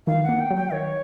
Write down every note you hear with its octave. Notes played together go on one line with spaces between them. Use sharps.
D#3 F5
F#5
A#3
G5
F#3
G5
D#3 C#5